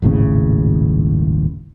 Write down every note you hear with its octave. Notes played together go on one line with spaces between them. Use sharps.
D#1 G#1 A2 C#3